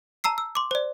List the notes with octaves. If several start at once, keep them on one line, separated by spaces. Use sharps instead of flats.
A5 A#5 E6 C7
E6
C6 D6
C5 D5